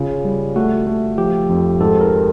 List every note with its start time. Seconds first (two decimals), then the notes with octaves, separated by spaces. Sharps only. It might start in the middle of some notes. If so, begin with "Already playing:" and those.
Already playing: C#3 F4
0.25 G3
0.56 A3 F#4
0.87 A3
1.18 F3 G4
1.49 F2
1.80 G#2 A4
2.01 A#4